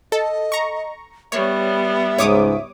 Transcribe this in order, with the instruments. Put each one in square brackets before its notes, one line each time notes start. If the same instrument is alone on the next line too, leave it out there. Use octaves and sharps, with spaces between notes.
[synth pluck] A4 [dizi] D#5
[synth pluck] A#5 C#6
[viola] G3 B3 [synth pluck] C#5 [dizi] E5
[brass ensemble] C#2 G#2 [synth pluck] C#5 D6 D#6